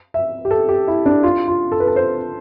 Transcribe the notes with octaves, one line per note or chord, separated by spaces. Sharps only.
E5
G4
A4
G4
E4
D4
F4
F4
A4
B4
A4
C5